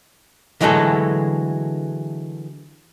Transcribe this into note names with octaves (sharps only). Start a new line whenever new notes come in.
D3 E3 F#3 G#3 A3 A4